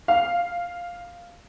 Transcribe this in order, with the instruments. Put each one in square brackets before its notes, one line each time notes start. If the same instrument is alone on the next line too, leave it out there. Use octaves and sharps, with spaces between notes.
[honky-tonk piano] F5